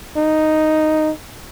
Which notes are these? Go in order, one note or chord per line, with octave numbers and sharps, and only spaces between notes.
D#4